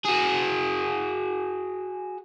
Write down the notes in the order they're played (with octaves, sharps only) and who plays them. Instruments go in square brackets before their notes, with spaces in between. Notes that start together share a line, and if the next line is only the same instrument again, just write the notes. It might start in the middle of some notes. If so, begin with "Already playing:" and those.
[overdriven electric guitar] F#4 G#4